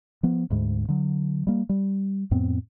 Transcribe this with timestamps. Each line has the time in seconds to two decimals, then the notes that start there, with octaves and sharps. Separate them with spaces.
0.23 F3 B3
0.50 D2 G#2 G#3
0.88 D3 F#3
1.47 G3 A#3
1.69 G3
2.31 F2 A2 B3 C4